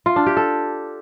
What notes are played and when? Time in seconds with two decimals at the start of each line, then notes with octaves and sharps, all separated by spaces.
0.06 F4
0.16 D4
0.26 G4
0.37 A4